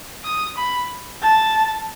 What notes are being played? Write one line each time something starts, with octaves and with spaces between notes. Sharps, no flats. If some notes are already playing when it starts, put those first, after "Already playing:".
D#6
B5
A5